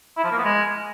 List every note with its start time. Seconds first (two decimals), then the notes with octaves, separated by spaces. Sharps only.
0.17 E4
0.24 F3
0.31 A#3
0.38 B3
0.45 G#3